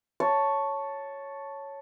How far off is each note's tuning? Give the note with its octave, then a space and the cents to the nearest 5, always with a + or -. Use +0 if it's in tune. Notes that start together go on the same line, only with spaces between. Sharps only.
C#5 +0 A5 +0